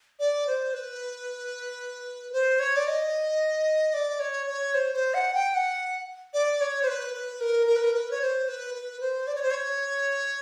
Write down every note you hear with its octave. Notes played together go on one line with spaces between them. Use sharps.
D5
C5
B4
C5
C#5
D5
D#5
D5
C#5
C#5
C5
C5
F#5
G5
F#5
D5
C#5
C5
B4
B4
A#4
A#4
B4
A#4
B4
C#5
C5
B4
B4
C5
D5
C#5
C5
C#5